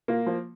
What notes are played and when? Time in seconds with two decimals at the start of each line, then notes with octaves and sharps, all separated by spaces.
0.08 A#2 A#3
0.26 F3